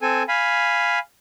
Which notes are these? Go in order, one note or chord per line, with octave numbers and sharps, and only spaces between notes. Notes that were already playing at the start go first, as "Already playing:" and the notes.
C4 A4 G#5
F5 G#5 B5